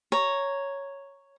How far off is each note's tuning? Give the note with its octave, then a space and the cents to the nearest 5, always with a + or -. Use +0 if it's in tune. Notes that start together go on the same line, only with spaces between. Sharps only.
C#5 +0 A#5 +0